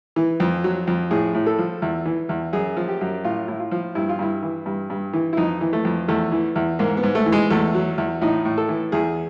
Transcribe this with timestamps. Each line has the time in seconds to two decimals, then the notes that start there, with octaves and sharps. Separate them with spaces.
0.16 E3
0.40 F2
0.64 F#3
0.87 F2
1.10 A2 G#4
1.35 A2
1.46 A4
1.59 F3
1.82 E2
2.06 E3
2.29 E2
2.53 F#2 G#4
2.77 F3
2.88 G4
3.01 F#2
3.24 A2 F4
3.48 A2 E4
3.60 F4
3.71 F3
3.95 G2 E4
4.09 F4
4.19 G2 E4
4.43 E3
4.66 G2
4.90 G2
5.13 E3
5.33 E4
5.37 F2 D#4
5.61 E3
5.73 A3
5.85 F2
6.08 E2 A3
6.32 E3
6.56 E2
6.79 G#2 A#3
6.97 B3
7.03 G#2
7.15 A3
7.26 E3
7.32 G#3
7.50 E2 A3
7.75 F#3
7.98 E2
8.21 A2 D#4
8.45 A2
8.58 A4
8.69 E3
8.92 E2 G#4